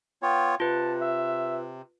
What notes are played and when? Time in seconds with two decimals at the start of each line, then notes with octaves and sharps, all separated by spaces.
0.22 B3 F4 C#5 G5
0.60 C3 F4 B4 A5
1.01 E5